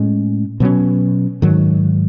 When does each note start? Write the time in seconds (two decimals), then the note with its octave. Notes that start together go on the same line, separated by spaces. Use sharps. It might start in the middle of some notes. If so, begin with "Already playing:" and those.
Already playing: A2 G#3 C#4
0.60 B2 F#3 C#4
1.42 G#2 D#3 F#3